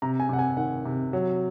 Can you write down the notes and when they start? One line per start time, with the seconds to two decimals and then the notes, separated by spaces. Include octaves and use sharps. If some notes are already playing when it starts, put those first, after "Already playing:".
0.02 C3 A#5
0.20 G#5
0.29 C3 F#5
0.39 G#5
0.57 D#3 F#5
0.85 C3
1.13 F#3